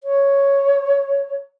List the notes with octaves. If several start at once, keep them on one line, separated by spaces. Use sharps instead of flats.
C#5